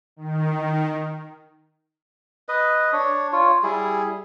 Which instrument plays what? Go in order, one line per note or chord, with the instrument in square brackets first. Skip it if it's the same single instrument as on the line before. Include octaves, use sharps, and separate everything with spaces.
[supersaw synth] D#3
[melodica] B4 D#5
D4 C#5
F4 C#5
G3 E4 G#4